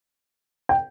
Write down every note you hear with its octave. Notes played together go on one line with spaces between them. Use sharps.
G5